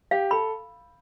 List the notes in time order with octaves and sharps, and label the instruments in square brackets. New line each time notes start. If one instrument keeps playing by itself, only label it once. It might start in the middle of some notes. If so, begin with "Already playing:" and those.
[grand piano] G4 [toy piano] F5
[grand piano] A4 [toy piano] B5